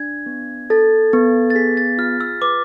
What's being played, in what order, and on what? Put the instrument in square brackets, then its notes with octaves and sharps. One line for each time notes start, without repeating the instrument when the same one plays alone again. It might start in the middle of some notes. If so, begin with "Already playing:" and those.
Already playing: [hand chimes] D4 [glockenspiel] G#6
[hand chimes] B3
[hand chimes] A4 [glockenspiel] A6
[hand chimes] B3
[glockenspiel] A6
[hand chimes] G#4 [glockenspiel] B6
[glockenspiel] A6
[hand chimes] F4 [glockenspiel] F6
[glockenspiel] E6
[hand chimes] B4 [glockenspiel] D6